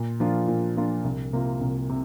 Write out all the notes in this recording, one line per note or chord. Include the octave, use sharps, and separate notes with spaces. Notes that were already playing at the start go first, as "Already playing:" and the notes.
Already playing: A#2
F3 A#3 D4 F4
A#2
F3 A#3 D4 F4
C2
C3 A#3 F4
C2
C3